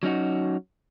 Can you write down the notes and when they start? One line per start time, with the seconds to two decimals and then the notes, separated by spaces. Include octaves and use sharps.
0.03 F#3 C#4 D#4 F#4